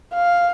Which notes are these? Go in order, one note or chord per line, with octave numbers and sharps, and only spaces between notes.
F5